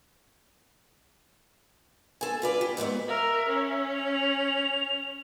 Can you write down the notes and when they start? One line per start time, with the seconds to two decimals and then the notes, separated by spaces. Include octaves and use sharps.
2.21 A4 G#5
2.42 F4 B4 D5
2.61 G4
2.77 F2 G#2 B3 E4
3.08 A#4 E5
3.49 C#4
3.94 F7